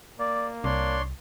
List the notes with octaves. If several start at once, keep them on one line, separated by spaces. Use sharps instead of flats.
A#3 D5
C2 D4 C#5 D5 C6